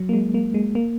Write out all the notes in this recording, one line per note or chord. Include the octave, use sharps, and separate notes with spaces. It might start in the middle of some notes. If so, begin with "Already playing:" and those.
Already playing: F#3
A#3
G#3
A#3
G#3
A#3